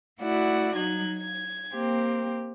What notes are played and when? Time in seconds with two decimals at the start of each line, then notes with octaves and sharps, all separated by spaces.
0.21 A3 E4 F#4 D5 F#5
0.76 F#3 D#4 F#6 G#6
1.18 G#6
1.72 A#3 C4 G4